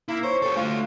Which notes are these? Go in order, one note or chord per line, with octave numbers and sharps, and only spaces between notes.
A#3 E4
C5 C#5
G4 A4
A3 D4 F4